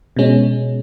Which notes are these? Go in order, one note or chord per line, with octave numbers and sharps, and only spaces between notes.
B2 G#3 C#4